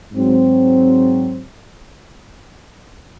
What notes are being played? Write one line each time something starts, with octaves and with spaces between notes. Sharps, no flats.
G#2 F#3 C4